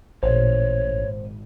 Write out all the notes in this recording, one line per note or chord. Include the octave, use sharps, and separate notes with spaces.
A1 A#2 C5 C#5
G#1